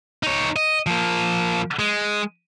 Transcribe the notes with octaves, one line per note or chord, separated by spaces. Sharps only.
D#4 C#5
D#5
F3 A#3
G#3